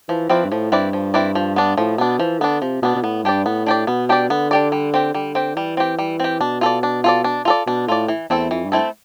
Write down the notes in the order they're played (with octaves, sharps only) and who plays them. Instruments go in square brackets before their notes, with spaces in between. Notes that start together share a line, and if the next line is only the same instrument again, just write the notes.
[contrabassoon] E3 [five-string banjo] F3
[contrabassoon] F3 [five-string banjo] C4 E4 B4 D5
[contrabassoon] G2
[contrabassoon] A2 [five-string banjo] F3
[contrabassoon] G2 [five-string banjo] C4 E4 B4 D5
[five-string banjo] F3
C4 E4 B4 D5
F3
B3 D4
[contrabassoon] A2 [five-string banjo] F3
[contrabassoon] B2 [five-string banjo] B3 D4
[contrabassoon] E3 [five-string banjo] F3
[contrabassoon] D3 [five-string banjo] B3 D4
[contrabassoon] C3 [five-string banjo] F3
[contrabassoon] B2 [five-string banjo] B3 D4
[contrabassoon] B2
[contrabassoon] A2 [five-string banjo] B3
[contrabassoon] G2 [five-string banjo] D4 G4 D5
[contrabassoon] A2 [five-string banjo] B3
[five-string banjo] D4 G4 D5
[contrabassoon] B2 [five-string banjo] B3
[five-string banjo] D4 G4 D5
[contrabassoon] D3 [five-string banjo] B3
[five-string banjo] D4 G4 D5
G3
C4 G4
[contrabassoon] D3 [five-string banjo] G3
[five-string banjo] C4 G4
[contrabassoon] E3 [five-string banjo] G3
[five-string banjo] C4 G4
G3
C4 G4
[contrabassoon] B2 [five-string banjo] D4
[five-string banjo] F4 A4 D5
D4
F4 A4 D5
D4
F4 A4 D5
[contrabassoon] B2 [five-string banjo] D4
[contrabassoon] A2 [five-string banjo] F4 A4 D5
[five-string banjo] E3
[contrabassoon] E2 [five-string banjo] A3 C4 E4 A4
[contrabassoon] F2 [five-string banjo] E3
[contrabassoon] G2
[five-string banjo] A3 C4 E4 A4